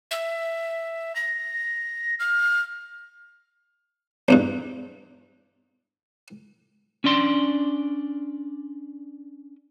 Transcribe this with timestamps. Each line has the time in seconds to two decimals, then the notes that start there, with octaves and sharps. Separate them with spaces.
0.11 E5
1.16 A#6
2.19 F6
4.28 B1 E2 G2
7.04 C#4 D4 D5 C6